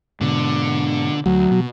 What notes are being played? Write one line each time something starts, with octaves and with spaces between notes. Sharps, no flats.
G#2 B2 D3
D2 F#3
B2